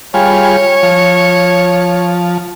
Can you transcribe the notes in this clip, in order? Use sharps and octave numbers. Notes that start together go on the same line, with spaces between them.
G3 F4 G#4 C#5
F3